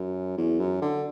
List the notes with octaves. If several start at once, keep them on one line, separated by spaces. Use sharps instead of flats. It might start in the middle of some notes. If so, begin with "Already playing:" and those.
Already playing: F#2
E2
F#2
D3